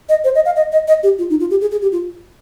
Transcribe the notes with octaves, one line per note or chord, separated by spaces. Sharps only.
D#5
C5
D#5
F5
D#5
D#5
D#5
G4
F4
D#4
F4
G4
G#4
G#4
G4
F4